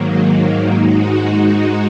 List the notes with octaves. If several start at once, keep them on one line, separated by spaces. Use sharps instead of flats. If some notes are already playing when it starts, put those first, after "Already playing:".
Already playing: G#2 D#3 F#3 A#3
G#2 G#3 D#4 F#4